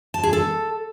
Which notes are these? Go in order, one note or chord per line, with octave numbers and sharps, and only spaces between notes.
A5
G#4
A4